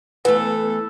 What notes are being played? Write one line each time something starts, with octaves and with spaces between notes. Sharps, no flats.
E3 A3 B3 A4